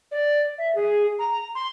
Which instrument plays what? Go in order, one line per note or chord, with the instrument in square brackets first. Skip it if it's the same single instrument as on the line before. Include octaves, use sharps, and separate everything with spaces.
[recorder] D5
E5
G#4
A#5
C6